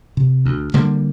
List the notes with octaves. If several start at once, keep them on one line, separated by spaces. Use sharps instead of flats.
C3
D2
D3 G3 A#3